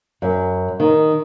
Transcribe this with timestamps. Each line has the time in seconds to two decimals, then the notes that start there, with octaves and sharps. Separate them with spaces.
0.22 F#2
0.80 D#3